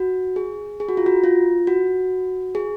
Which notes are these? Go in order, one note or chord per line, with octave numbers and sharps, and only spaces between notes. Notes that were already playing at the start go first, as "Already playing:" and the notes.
Already playing: F#4
G#4
G#4
F#4
F4
F#4
F4
F#4
G#4